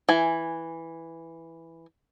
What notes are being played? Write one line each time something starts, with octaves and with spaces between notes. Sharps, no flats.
E3 G#5